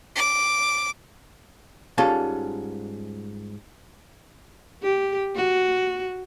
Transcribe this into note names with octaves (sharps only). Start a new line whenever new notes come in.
D6
G#2 G3 C#4 F4 A4 A5
G4
F#4